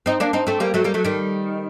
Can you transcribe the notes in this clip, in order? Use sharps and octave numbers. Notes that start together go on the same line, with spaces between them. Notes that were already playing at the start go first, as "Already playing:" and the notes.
C4 D#4
A#3 D4
C4 D#4
A3 C4
G3 A#3
F#3 A3
G3 A#3
F#3 A3
D#3 G3